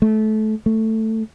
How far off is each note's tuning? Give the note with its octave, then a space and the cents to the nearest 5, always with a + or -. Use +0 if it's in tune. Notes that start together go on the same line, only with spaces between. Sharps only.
A3 -25
A3 +10